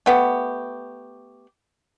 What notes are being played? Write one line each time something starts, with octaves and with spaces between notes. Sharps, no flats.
A3 B3 G4